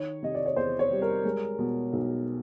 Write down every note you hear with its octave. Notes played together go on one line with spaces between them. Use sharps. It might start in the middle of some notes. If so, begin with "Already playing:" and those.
Already playing: D#3 C#5
C3 D#5
D5
C#5
E2 C5
C#5
G3
A#4
G#3
B2
B1